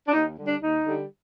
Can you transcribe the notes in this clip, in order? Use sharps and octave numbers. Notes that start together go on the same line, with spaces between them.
D4
D#2 D#4
D3 G3
D4
D#2 D#4
D3 G3